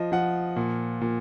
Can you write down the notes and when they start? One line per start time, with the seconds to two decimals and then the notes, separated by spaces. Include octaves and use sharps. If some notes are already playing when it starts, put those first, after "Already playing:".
Already playing: F3 D#5
0.12 F3 F#5
0.56 A#2
1.01 A#2